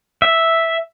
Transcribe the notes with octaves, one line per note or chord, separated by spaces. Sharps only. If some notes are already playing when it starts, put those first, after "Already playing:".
E5